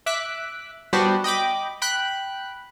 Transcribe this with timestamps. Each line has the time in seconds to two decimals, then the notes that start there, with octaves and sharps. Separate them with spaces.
0.06 E5 D6 F#6 B6
0.93 G3 B3 D4 F#4 G4 C5
1.24 D#5 G5 B5 D6
1.82 G5 B5 F#6